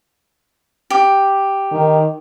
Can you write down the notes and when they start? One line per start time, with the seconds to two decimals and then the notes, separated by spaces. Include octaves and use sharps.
0.90 G4
1.72 D#3